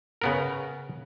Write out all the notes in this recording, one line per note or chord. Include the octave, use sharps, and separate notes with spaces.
C#3 B3 A#4